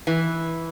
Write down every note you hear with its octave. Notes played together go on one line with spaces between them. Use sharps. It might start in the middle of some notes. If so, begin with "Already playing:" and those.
E3